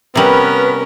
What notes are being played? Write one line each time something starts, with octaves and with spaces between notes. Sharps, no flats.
C3 G3 B3 C#4 A#4 B4